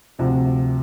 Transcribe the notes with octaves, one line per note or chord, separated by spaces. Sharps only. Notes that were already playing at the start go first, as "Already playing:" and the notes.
D2 C3 F3